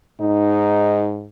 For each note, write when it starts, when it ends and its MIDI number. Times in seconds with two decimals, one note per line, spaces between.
0.21 1.29 44
0.21 1.10 63